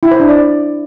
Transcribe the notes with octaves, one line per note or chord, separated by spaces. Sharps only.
E4
C5
D4
D5